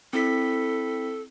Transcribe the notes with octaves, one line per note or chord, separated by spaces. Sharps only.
C4 E4 A4 B6